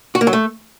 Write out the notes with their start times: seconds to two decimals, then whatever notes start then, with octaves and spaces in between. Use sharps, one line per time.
0.15 F#4
0.21 A#3
0.27 F#3
0.33 A3